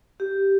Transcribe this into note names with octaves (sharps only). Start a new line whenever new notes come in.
G4